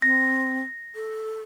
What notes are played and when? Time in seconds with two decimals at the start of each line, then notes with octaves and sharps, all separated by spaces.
0.02 C4 A#6
0.95 A4